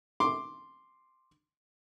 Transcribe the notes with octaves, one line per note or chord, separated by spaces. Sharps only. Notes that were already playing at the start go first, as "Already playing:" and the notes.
C6 D6